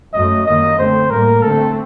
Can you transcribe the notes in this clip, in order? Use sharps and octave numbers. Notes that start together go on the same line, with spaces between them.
F#2 F#3 A3 D#5
F#2 D#3 G3 A#3 D#5
D3 A3 C4 C5
A2 G3 A#3 A#4
D3 A3 C4 A4